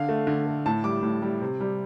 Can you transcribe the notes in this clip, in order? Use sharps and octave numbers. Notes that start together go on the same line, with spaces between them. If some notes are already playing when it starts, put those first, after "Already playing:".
Already playing: D3 F5
A3
D3
A3
A2 A5
G3 D6
A2
G3
C3
G3